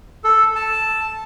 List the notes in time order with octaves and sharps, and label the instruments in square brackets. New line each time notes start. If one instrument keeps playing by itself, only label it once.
[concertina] A4
A5